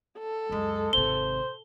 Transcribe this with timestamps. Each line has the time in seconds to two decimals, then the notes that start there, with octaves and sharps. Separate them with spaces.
0.19 A4
0.50 C#2 F#2 G#3
0.93 G#1 C3 C5 G7